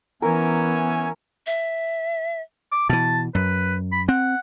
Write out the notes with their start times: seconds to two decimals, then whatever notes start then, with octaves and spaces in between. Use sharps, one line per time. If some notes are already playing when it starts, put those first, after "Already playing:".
0.22 E3 B3 C#4 A#4 E5 G#5
1.46 E5
2.72 D6
2.89 B2 E3 A5
3.35 F#2 B4
3.92 B5
4.09 C4 F#5